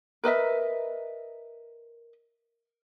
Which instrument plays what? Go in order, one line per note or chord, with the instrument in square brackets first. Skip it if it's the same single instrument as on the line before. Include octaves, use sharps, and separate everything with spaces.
[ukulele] A#4 B4 D#5 E5